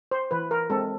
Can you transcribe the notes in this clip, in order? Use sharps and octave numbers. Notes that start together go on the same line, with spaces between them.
C5
E3 B4
A#4
G#3 C4 A4